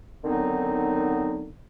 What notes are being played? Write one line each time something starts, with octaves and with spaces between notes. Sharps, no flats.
D3 D#3 F#3 B3 C4 D#4